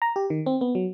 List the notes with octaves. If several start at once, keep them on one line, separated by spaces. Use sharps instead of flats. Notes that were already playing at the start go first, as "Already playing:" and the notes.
A#5
G4
D#3
C4
B3
F#3